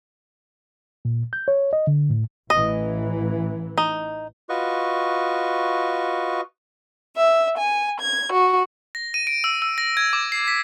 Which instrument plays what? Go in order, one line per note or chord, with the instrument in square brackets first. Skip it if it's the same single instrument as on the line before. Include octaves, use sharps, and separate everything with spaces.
[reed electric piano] A#2
G6
C#5
D#5
D3
A2
[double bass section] A1 E3 [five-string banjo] D#5
[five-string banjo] D#4
[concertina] F4 F#4 B4 D#5 C#6
[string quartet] E5
G#5
G#6
F#4
[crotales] A#6
D#7
D7
E6
E6
A#6
G#6
D6
C7
B6